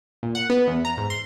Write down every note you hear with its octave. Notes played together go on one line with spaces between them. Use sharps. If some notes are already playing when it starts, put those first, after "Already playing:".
A#2
F#5
B3
E2
A#5
G#2
C6